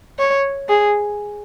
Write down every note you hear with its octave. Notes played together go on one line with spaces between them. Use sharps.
C#5
G#4